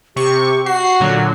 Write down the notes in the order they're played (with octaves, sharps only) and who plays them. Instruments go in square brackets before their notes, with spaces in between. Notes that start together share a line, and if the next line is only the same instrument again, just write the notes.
[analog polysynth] C3 C#6 [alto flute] G4
[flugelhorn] F#4 [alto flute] F#5 [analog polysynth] C7
[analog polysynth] A#2 D3 F#3